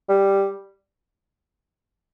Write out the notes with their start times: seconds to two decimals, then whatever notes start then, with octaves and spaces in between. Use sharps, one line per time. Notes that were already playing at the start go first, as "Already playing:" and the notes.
0.09 G3